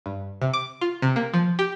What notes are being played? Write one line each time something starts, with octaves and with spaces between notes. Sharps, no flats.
G2
C3
D6
F4
C3
A#3
F3
G4